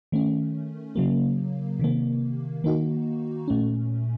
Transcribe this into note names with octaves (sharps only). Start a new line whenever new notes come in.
D#3 A3 C#4
C#3 F#3 A#3
C3 D#3 A#3
D#3 A#3 D#4 F#4
A#2 A3 C#4